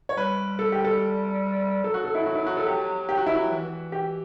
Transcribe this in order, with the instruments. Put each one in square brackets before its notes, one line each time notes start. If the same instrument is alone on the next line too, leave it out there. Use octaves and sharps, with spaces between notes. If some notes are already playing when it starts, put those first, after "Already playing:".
[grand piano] C#5
[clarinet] G3 [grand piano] B4
[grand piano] A4
G4
A4
[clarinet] F#3 [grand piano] A4
[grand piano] F#4
A4
E4
F#4
E4
F#4
A4
G4
G4
F#4
E4
F#4
[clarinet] E3
[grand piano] G4